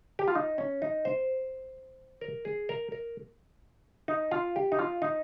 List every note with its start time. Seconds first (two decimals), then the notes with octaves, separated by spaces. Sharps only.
0.19 G4
0.28 F4
0.35 D#4
0.58 C#4
0.82 D#4
1.05 C5
2.21 A#4
2.45 G#4
2.69 A#4
2.92 A#4
4.08 D#4
4.31 F4
4.56 G4
4.72 D#4
4.79 F4
5.02 D#4